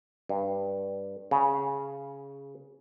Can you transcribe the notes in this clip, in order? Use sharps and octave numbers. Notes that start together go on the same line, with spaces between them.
G2
C#3